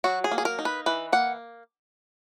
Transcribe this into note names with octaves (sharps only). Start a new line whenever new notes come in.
F#3 F#4
G#4
A#3
G#4
A#4
D#4
B4
E3 B4
A#3 F#5